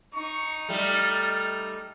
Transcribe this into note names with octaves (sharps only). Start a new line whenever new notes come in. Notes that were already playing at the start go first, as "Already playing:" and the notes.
D#4 C#6
G3 A3 F6